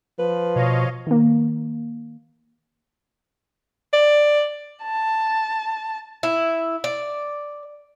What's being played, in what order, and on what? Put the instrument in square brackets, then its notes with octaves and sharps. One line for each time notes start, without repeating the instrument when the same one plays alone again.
[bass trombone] F3 [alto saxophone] B4
[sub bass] B2 [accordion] C#5 D#5 F5
[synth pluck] D#3 A#3
[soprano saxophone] D5
[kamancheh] A5
[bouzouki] E4
D5